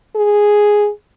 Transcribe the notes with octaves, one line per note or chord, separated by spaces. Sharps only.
G#4